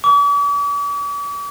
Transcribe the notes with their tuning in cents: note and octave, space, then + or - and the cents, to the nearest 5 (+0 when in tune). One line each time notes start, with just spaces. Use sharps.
D6 -45